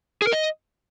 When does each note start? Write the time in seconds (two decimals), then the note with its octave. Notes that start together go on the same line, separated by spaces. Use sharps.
0.22 G#4
0.27 A#4
0.33 D#5